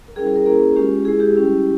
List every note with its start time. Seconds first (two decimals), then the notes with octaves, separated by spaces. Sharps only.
0.08 A#4
0.16 G3 C#4 E4 G#4
0.27 G#4
0.36 A#4
0.46 A#3 C#4 E4 G#4
0.76 G#3 C#4 F4 G4
1.05 G#3 E4 G#4
1.20 G4
1.35 G3 C#4 E4